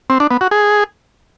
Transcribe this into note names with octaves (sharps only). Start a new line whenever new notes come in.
C4
D4
B3
F#4
G#4